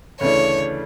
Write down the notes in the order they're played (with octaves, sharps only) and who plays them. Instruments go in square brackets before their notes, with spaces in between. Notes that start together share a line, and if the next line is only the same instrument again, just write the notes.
[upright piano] D2 C#3 E3 A3 D4 [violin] C#5